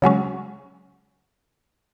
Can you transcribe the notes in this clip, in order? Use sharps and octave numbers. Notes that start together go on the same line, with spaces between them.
C#3 F#3 G#3 C#4